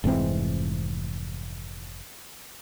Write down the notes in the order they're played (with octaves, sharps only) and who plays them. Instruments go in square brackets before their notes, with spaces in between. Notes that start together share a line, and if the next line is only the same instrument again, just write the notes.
[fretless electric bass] F1 G#2 E3 C4